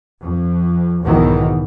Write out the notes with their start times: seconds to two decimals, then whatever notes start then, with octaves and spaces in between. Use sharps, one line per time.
0.21 F2
1.02 B1 E2 G#2 B2 D#3 E3